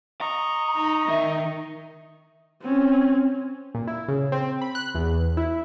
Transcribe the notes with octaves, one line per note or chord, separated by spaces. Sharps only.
D#5 A#5 C#6
D#4
D#3 D#4 E5
C4 C#4
A#2
E4
C#3
C4
B5
F#6
E2
E4